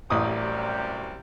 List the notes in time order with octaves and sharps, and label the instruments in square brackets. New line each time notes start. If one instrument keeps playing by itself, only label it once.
[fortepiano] A1 D#6 [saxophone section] F#2 C3 G3